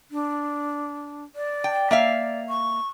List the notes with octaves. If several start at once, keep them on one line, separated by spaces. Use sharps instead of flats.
D4
D5
G5
A#3 E5 F5
C#6